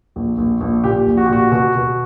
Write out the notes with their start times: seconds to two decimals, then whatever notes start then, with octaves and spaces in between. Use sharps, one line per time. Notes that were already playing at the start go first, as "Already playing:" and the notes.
0.16 A#1
0.38 A#1
0.61 A#1
0.84 A#2 G4
1.06 A#1
1.17 F#4
1.26 G4
1.29 A#2 F#4
1.52 B2 F#4
1.75 B2